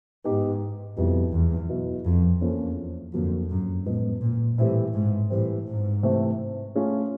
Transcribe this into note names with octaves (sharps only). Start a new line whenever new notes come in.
G#2 B3 D#4 G4
F2 B2 G3 B3 E4
E2
B2 F#3 B3 E4
F2
E2 A#3 C#4 F4 A4 C5
F2 D3 F#3 A#3
F#2
A2 F3 G#3 B3
A#2
A2 E3 G3 C4 E4
G#2
A2 E3 G3 C4
G#2
C3 E3 A3 C4
A3 C#4 F4 G#4